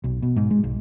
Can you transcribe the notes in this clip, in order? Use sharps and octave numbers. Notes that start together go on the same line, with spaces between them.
B1
B2
G#2
G#3
B1